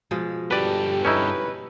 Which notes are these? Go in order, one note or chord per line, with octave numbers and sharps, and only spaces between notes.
B2 F3 G#3
G2 G4 A4 B4 D5
C#4 D#4 E4 B4